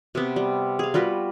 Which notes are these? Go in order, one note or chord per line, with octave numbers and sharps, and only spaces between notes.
C3 B3
G3
G#4 F5
G3 F4 F#4 B4